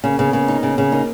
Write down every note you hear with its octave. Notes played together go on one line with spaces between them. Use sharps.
C#3 A#3 C#4
C#3 B3
C#3 A#3
D#4
C#3
C#3
A#3 D#4